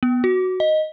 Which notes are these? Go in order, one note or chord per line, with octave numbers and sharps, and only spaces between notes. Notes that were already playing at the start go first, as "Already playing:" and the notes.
B3
F#4
D#5